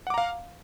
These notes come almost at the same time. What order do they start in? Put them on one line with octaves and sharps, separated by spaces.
F#5 D6 A#5 F5